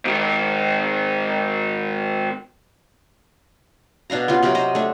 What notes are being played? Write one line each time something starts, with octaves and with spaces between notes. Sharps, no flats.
G#2 D#3
B2 D4 F5 A#5
B3 C#4 F4 G4
C3 F#3 G4 A#4
C5 D#5 A#5
A3 D4